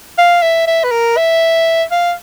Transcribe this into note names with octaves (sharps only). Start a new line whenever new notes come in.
F5
E5
E5
B4
A#4
E5
F5